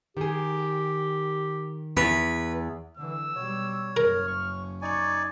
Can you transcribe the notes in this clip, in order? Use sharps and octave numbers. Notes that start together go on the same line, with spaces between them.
D#3 G4 G#4
E2 B4
D3 E3 E6
B2 G3 C#5
F#1 C#4 A#4 F6
C#6
D#4 D5 G#5 C#6